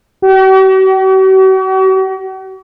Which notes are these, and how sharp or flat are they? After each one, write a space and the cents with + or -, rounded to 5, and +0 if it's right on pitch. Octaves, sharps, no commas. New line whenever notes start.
F#4 +45